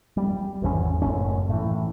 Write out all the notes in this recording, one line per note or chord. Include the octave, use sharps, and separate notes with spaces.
G3
G#1 E2 D3 C#4
F#1 F#2 A2 C#4
A2 E3